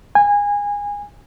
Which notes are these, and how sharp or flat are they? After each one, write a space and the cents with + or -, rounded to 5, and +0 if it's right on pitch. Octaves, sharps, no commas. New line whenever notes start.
G#5 -25